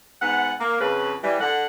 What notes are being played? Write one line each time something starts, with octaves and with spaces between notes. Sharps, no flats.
G#2 B3 F#5
A#3
F2 C#3 B4
E3 G3
D3 F#5